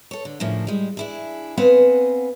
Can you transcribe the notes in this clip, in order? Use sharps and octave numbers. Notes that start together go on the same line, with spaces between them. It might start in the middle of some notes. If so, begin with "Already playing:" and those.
A4 C#5
D3
A2 C#3 F3 A#3 D4
G3 G#3
D4 E4 G#4
B3 C4 B4 F5 F#5 G#5